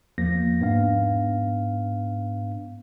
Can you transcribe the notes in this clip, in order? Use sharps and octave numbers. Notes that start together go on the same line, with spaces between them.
E2 F3 A#3 A#6
G#2 B3 D4 F5